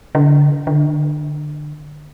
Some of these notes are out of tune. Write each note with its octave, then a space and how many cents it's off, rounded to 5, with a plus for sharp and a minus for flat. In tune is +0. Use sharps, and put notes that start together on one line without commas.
D3 -20
D3 +25